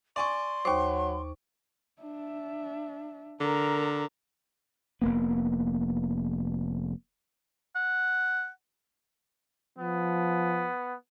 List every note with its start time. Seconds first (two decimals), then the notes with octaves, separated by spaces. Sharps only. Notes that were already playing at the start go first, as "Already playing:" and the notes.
0.16 D5 G#5 C6 C#6
0.65 D#2 F#3 C5 C#6 D6
2.02 D4 E5
3.40 D3 A#4 A#5
5.02 F1 A#3 B3
7.75 F#5
9.79 F3 B3